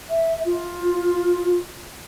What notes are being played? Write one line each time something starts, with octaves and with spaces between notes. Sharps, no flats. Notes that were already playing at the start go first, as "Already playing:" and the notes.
E5
F4